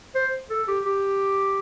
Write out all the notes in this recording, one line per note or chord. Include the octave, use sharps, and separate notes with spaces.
C5
A4
G4
G4